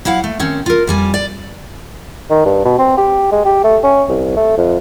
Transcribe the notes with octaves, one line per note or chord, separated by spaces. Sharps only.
F#3 E4 F5 F#5
A3
D#3 C4 C#4
F4 A#4
F2 G3 G#5
D5
D#3
G2
B2
C4
G4
G#3
G4
A3
C#4
C2
A3
F2